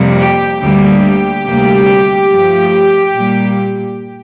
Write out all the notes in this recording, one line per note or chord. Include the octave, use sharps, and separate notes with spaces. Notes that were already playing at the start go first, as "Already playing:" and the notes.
Already playing: F2 C3 G3 A#3
G4
D2 D3 G3 A#3 G4
D2 C3 G3 A#3
G2 F3 A3
A#2 G3 A#3